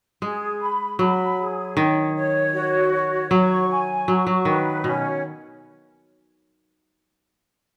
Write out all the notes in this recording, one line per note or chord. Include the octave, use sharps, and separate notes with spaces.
G#3 G#4
B5
F#3 B5
G#4
D#3 C#5
C#5
F#4
C#5
F#3 C#6
G#5
F#3 C#6
F#3
D#3 B4
B2 C#4